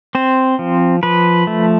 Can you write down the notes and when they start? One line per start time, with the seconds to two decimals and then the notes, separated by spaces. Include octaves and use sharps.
0.15 C4 C5
0.59 F3
1.03 F3 B4
1.47 A3